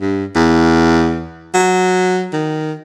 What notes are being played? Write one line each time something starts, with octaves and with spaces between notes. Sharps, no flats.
G2
E2
F#3
D#3